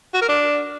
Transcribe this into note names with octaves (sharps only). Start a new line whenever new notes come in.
F#4
A#4
D4